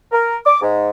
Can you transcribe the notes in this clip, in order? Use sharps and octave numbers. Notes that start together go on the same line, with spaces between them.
A#4
D6
G#2